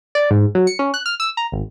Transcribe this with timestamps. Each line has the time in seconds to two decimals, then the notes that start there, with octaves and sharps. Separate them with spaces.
0.15 D5
0.30 G#2
0.55 F#3
0.67 C#7
0.79 C#4
0.94 F#6
1.06 F6
1.20 E6
1.37 A#5
1.52 G#1